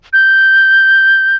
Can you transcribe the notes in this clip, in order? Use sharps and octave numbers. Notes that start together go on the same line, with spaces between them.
G6